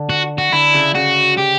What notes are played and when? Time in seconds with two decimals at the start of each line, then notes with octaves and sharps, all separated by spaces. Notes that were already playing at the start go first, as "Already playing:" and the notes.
Already playing: D3
0.10 F#4
0.38 F#4
0.52 D3 E4
0.74 C#3
0.95 C#3 F#4
1.38 G4